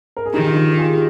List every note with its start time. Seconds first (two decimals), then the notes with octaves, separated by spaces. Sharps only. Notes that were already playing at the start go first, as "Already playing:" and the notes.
0.17 A#4
0.26 G#4
0.34 D#3 D#4 G4
0.45 F4
0.55 D#4 G4
0.71 G4
0.78 F4 G#4